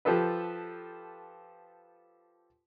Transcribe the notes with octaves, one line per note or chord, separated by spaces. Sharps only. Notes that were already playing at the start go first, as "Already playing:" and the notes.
F3 G4 A4 B4